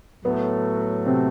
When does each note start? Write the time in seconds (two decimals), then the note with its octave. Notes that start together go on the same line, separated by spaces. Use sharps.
0.24 A2 F#3 A3 B3
1.06 C3 C4